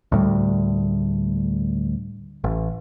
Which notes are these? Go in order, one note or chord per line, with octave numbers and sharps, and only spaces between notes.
D2 A2 G3
A1